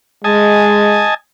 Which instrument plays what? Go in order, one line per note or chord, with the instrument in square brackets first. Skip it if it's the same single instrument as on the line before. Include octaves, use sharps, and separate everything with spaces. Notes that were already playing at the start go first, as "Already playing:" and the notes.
[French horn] G#3 [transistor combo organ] D#5 G#5 A5